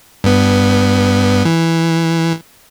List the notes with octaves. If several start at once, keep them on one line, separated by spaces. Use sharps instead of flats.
G2 B3
E3